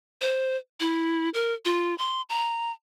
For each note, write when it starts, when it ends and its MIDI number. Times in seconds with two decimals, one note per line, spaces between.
0.21 0.57 72
0.80 1.29 64
1.34 1.53 70
1.65 1.97 65
1.98 2.22 84
2.29 2.71 82